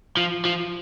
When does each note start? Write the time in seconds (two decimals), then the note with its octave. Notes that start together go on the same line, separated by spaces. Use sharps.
0.17 F3
0.45 F3